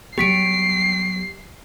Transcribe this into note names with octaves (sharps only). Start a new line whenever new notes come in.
F#3 G3 B3 G4 B6 C7 D7